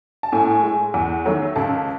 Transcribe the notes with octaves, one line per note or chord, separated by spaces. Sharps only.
A5
A2 G#5
G#3
E2
D#3 F#3 A3
C#2 A5